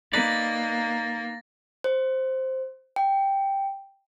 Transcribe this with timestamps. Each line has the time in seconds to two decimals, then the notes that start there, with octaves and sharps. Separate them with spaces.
0.13 A#3 D#4 B4 D5 A6 A#6
1.84 C5
2.96 G5